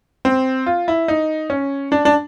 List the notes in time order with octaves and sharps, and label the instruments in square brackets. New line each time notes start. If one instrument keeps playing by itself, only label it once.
[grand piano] C4
F4
E4
D#4
C#4
D4
D4